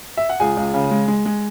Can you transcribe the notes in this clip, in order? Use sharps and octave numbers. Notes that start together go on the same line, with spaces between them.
E5
F#5
C#2 G#4 G#5
C#2
C#3
G#3
G#3
G#3